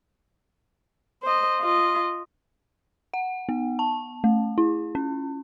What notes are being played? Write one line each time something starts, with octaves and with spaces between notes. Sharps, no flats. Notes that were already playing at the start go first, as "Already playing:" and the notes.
C5 D#5
F4 D#5
F#5
B3
A5
A3
E4
C#4